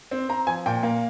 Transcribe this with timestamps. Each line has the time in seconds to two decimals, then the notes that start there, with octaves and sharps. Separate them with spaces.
0.11 C4
0.29 C4 A#5
0.47 F3 G#5
0.66 A#2 G5
0.83 A#3